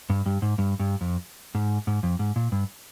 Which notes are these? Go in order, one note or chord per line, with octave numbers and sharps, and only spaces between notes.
G2
G2
G#2
G2
G2
F2
G#2
G#2
F2
G#2
A#2
G2